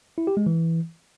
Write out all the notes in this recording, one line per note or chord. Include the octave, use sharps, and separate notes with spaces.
E4
G4
G#3
E3